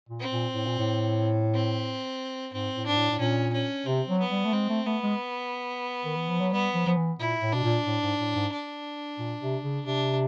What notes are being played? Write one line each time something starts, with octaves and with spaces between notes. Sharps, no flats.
A#2
C4
A#2
A2
A#2
A2
C4
G#2 C4
A2
G#2 D4
A2
A2
A#2 C#4
C#4
C3 C4
F#3
B3
G3
A3
G#3 C4
A3
A3 B3
G#3
D#3
E3
F3
F#3
G3 B3
F3
F3
E3
A#2 E4
A2
B2 D4
A#2
A2
G#2
A2
G#2
D4
A#2
C3
C#3
C3 D4